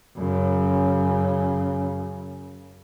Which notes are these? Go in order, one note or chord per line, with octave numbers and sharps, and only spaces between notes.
F#2 C#3